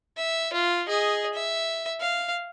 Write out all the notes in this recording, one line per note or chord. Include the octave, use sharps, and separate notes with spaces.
E5
F4
G#4 D#5
E5
F5